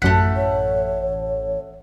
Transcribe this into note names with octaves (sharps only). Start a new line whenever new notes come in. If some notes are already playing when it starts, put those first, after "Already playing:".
A1 F#2 A3 F#5 B6
C#5